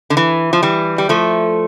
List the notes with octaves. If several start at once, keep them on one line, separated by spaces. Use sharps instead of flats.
D3
E3
F3
E3 G3
G3
F3 A3